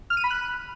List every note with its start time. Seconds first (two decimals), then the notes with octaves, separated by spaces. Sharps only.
0.10 F6
0.17 D#7
0.24 B5
0.31 F#6